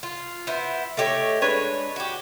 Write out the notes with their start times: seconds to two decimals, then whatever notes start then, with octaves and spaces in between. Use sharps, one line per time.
0.03 F4
0.47 B3 E4 C5
0.97 A3 D#4 G4 C#5
1.42 G#3 D4 B4 C#5
1.96 F#4 G4